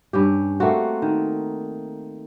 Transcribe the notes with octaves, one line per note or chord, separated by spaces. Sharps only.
G2 C#4 G4
A3 A#3 C4 F#4
D#3